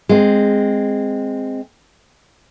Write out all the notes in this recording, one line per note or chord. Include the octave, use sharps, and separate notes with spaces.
G#3 C4